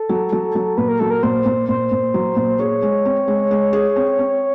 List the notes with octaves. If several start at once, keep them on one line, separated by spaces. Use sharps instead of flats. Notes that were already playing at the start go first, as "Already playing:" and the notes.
Already playing: A4
F#3
F#3
F#3
A#2 B4
A#4
F#3 A4
A#4
A#2 C5
A#2
A#2 C5
A#2
F#3
A#2
G#4 C#5
G#3
C4
G#3
G#3
G#4
C4
C4